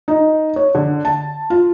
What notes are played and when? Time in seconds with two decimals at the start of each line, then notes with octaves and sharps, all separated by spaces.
0.08 D#4
0.56 C#5
0.75 D3
1.05 A5
1.50 F4